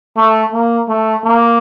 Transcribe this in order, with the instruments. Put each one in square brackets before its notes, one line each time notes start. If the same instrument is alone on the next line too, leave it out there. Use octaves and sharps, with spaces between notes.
[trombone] A3
A#3
A3
A#3